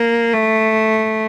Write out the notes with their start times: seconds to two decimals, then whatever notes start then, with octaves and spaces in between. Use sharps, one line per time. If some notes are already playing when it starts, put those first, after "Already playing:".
Already playing: A#3
0.34 A3